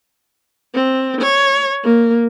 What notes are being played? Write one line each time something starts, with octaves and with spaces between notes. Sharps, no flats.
C4
C#5
A#3